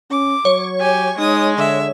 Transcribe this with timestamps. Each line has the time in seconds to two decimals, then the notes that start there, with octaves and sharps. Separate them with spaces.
0.11 C#4 D6
0.45 F#3 C#5
0.81 G4 G#5
1.18 G#3 D#4 D#6
1.57 D3 E5